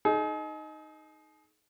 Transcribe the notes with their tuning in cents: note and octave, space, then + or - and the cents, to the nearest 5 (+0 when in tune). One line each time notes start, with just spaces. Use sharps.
D#4 +0 G#4 +40